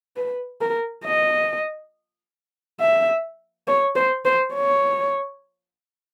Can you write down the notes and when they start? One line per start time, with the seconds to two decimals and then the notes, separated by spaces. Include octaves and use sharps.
0.16 B4
0.61 A#4
1.04 D#5
2.80 E5
3.68 C#5
3.96 C5
4.25 C5
4.54 C#5